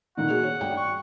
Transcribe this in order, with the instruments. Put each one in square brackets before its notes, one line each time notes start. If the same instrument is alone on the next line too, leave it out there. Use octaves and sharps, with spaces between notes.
[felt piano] A#2 D3 D#3 [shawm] F#5
[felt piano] F#4 G#4
C#5
G2 G3 G5
[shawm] C#6